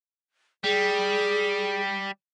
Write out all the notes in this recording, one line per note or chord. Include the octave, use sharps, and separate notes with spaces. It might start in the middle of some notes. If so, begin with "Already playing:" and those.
G3 G#4